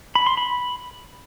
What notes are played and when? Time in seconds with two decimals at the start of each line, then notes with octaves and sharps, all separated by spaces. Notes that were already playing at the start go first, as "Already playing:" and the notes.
0.15 B5
0.26 C6
0.37 B5